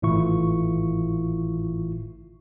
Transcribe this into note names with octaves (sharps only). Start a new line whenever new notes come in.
G#1 A2 E3 E4 F4 C#6